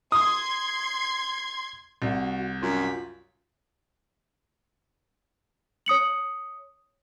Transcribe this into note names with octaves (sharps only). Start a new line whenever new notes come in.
C6 D#6 G#6
C2 F#4
F#2 F4 B6
C#5 D#6 C#7 F#7